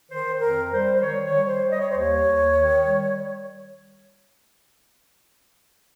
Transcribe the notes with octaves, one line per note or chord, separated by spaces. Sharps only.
D#3 C5
F2 A#4
G3 C5
C5
D#3 C#5
C#5
G3
C5
G3
D#5
C#5
D#2 C5
C#5
D#2
D#3
G3